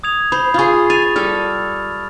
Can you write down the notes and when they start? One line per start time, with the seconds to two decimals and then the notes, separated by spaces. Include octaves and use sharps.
0.04 D#6 G#6 F7
0.32 C5 B5
0.54 F4 G#4 B5 C#6
0.90 G#5 A6 F7
1.16 G3 A4 F6